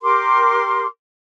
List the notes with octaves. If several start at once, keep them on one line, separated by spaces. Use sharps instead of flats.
G4 A#4 C6 D6